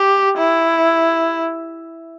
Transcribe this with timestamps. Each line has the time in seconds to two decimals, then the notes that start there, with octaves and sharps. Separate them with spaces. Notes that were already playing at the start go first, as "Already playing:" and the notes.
Already playing: G4
0.38 E4